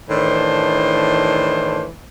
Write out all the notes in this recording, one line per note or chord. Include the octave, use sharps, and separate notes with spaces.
A2 D#3 E3 D4 C5